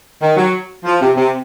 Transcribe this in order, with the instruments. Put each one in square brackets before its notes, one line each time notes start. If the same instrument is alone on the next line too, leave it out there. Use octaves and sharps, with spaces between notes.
[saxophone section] D#3
F#3
F3
C3
C3